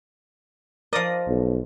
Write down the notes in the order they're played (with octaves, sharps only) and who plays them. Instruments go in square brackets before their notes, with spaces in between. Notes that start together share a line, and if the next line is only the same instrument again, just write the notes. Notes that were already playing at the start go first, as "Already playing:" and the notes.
[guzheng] F3 D#5 [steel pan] A#4 D5 D#6
[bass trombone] B1